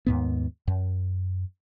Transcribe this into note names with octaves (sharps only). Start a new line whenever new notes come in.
D#2 G#2 B3
F#2